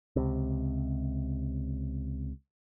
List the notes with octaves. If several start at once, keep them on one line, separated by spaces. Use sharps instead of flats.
C#2 C3